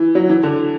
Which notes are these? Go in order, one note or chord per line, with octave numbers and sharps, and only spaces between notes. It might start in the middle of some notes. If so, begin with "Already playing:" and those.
Already playing: E3
F#3
E3
D3